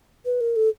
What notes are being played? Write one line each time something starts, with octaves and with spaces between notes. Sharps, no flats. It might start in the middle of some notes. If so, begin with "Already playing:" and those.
B4
A#4
A4